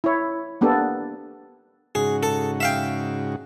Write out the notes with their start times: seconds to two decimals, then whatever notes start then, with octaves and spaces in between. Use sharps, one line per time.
0.04 E4 C#5
0.61 A#3 B3 D4 G4 A4
1.95 G#2 C#3 F#4 G#4
2.23 A4
2.60 E5 F5 G5